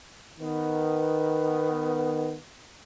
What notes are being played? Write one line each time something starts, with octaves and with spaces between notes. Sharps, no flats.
D#3 B3